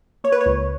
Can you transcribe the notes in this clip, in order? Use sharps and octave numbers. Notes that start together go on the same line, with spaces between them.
A#3 C#5
B4
C#5
C#2